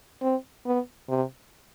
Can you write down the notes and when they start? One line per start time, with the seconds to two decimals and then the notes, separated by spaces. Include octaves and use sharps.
0.22 C4
0.66 B3
1.09 C3